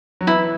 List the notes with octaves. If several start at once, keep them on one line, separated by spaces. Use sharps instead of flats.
F#3
E3 E4